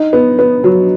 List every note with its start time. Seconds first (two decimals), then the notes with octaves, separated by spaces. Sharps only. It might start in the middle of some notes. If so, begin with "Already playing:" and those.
Already playing: D#4
0.13 B3
0.39 B3
0.64 F#3